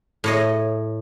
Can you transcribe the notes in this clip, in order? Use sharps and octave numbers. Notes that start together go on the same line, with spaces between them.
A2 C#5 D#5